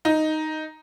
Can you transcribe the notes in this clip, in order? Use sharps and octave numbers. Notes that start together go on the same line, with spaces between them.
D#4